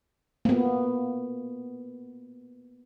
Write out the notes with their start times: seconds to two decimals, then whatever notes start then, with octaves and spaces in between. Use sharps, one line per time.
0.45 A#3 B3